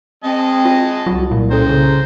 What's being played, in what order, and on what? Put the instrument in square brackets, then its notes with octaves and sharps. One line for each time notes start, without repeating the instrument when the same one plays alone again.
[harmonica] G#3 D#5 A5 [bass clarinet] C4
[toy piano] F4
[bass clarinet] C2 [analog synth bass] F#3 [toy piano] F4
[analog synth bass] A#2
[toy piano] C#4 A4 [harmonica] C5 A#5
[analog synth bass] C#3